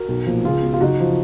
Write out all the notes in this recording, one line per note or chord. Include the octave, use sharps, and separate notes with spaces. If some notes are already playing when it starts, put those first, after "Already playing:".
Already playing: F#4 A#4
B1
A#2 F3
C#2 F4 G#4
B2
F4
F#1 D#4 F#4
F3